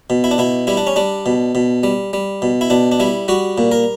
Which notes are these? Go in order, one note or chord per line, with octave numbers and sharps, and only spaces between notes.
B2
E4
D4
B2 E4
G3 E4
D4
C#4
G3 D4
B2
B2
G3
G3
B2
E4
B2 D4
D4
G3 E4
G3 F#4
A#2
A#4